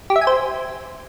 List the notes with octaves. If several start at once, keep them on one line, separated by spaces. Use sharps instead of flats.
G4
E5
G#5
C5